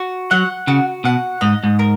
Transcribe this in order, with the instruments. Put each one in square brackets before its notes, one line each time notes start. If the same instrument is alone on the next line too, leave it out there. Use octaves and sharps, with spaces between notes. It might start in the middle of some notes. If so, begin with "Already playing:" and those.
Already playing: [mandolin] F#4
[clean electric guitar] F#3 [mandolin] F#5
[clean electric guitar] C#3 [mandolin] F#4
[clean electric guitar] B2 [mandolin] F#5
[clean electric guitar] G#2 [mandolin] D#5
[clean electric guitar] G#2
[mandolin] A#4